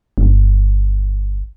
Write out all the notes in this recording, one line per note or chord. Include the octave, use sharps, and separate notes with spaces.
G1